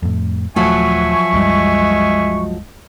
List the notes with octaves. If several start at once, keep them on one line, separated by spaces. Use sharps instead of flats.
F2 A2
D#1 F3 F#3 A3 F#4 E5 G#5 C#6
C2 F#2 G3 G#3